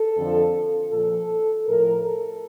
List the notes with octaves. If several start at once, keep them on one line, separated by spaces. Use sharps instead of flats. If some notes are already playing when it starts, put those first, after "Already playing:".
Already playing: A4
F2 D3 F3
A#2 F3 A4
A2 F3 A#4
A4